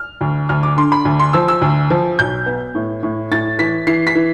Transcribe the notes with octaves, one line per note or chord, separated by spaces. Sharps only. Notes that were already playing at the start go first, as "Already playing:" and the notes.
Already playing: F6
D2
D2 F6
D6
D3 C6
B5
D2
C6
F3 E6
E6
D2
F3
B1 G6
B3
A2
A2
A2 A6
E3 B6
E3 C7
B6
E3